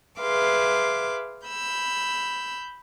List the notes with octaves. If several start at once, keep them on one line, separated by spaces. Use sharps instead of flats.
G#4 B4 E5 F5 C6 D6
B5 E6 G6